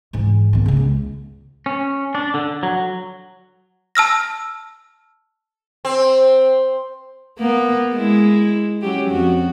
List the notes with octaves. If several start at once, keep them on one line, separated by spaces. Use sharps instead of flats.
G#2 E3
D#3 B3
C#3 A#3
C#2
C#4
D4
D3
F#3
A5 E6 F6 A#6
C4
A#3 B3
G#3 E4
F#3 C#4 G4
F2 F#4